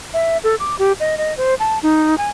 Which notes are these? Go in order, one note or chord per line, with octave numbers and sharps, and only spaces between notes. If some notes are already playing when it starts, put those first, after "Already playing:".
E5
A4
D6
G4
D#5
D#5
C5
A5
D#4
G#5